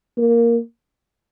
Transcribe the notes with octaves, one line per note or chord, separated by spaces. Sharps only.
A#3